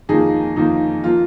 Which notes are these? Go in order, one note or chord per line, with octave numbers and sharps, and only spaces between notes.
F2 D#3 A#3 D#4 G#4
F2 D#3 A#3 D#4
F3 A#3 F4